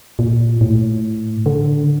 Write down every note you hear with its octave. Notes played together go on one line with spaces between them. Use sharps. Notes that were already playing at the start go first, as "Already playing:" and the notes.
A#2
A2
D3